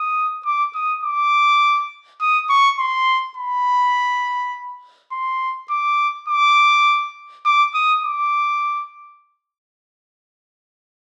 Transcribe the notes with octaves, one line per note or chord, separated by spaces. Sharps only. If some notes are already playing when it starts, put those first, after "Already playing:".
Already playing: D#6
D6
D#6
D6
D#6
C#6
C6
B5
C6
D6
D6
D6
D#6
D6